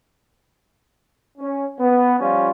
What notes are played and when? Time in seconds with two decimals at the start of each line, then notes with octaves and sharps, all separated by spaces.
1.38 C#4
1.79 B3
2.19 F3 G3 C#4 F4